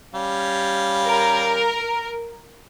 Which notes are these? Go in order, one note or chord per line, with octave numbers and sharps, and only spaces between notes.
G3 C#4 F5
A#4